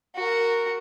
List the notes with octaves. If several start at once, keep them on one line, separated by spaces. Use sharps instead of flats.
F#4 A#4